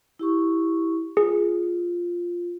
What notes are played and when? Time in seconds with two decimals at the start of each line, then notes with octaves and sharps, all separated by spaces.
0.19 E4 G4 C#6
1.17 F4 G#4